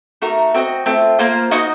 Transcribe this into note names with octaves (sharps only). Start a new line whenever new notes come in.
A3 D#4 F#4 A#4
C4 F#4 C5 D#5
A3 C4 F4
A#3 F4 C5 F5
D#4 F#4 C5 D#5